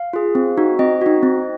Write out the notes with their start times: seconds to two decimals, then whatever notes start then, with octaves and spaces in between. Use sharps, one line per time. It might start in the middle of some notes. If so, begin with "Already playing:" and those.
Already playing: F5
0.13 F4 G#4
0.35 C4
0.57 D#4 F#4
0.79 C4 D#5
1.01 D#4 F#4
1.23 C4